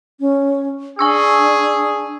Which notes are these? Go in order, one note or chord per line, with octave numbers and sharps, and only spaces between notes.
C#4
D4 G#4 G#5 C#6 E6